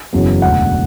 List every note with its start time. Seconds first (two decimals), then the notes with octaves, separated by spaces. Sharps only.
0.13 F#1 E2 C#3 F#3 B3
0.42 E1 D2 D3 F#5